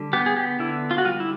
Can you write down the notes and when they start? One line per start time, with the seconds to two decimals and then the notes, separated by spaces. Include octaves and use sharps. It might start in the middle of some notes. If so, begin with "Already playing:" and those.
Already playing: D3 G3
0.13 B3 G4
0.26 G#4
0.37 G4
0.60 D3 E4
0.91 F4
0.98 F#4
1.05 G3 F4
1.20 E4